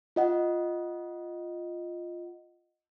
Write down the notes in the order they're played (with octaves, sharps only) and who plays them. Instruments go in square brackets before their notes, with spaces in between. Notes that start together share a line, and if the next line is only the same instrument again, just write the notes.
[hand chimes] F4 D#5 F#5